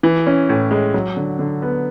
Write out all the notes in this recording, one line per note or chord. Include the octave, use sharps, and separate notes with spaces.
E3
C#4
A2
G#3
F#3
D3
D3
B3